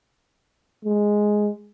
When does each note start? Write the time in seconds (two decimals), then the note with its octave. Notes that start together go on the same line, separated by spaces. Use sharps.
0.85 G#3